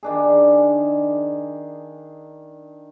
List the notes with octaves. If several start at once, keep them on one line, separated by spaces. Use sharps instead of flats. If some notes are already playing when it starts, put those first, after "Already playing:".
D#3 D4 G#4